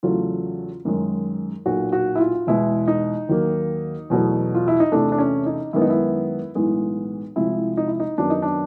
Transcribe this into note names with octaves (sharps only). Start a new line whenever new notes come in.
E2 C#3 F#3 A3 F4
F#2 D#3 G#3
B1 A#2 F#3 F#4
F#4
E4
F4
E2 B2 G#3 E4
D#4
D#2 D#3 F#3 A#3
E2 B2 F#3 A3
F4
E4
D#4
E2 C3 E3 A3 D4
D4
C#4
D#4
F#2 D#3 G#3 B3 E4
D#4
E4
B1 A2 E3 G#3 B3
C2 C3 F3 G#3 E4
D#4
E4
D#4
F#2 D#3 F#3 B3 D4
D#4
D4